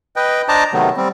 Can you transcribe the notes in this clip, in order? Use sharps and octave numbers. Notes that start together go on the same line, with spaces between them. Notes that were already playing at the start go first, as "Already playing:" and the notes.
B4 D#5 G5
D4 C5 D#5 A5 A#5 D6
C3 D#3 F#3 A3 B3
G3 C4